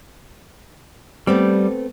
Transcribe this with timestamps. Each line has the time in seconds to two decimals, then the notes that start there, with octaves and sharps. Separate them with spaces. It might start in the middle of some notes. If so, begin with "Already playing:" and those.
1.27 G3 A3 B3 C4